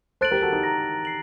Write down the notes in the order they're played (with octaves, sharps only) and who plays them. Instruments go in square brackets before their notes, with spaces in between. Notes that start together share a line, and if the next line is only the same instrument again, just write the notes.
[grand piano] A4 C5 [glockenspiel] F#6 A6 D7 F#7
[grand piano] G4 A#4
F#4 A4
D#4 G4
[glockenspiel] A#5 F#6 A#6
C7 F#7